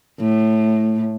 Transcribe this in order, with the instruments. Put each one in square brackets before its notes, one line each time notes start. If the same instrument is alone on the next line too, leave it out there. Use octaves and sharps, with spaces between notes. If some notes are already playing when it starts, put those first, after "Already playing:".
[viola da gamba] A2